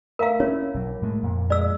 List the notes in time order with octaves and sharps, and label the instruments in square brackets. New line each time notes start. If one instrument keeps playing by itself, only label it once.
[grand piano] D2 E5 A#5 [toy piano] A#4 F5
[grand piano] A#3 E4 [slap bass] C#4 [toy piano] C#5
[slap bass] B1 F#3
A2 G#3 A3
F2 A#2
[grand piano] G#3 [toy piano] D5 E6